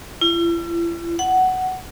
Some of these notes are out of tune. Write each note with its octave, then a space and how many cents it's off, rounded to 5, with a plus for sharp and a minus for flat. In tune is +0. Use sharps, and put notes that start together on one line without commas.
E4 +45
F#5 +10